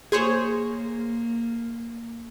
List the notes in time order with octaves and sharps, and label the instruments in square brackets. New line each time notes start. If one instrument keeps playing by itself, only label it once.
[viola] A#3 [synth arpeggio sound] G#4 C5 C#5